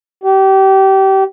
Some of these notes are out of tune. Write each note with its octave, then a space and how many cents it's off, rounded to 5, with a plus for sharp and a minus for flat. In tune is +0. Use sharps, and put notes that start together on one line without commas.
G4 -25